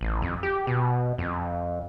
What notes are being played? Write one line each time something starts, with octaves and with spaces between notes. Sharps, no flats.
A1
F2
G4
B2
F2